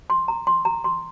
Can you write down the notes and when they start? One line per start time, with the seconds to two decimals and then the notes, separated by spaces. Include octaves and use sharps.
0.10 C6
0.28 A#5
0.47 C6
0.65 A#5
0.84 C6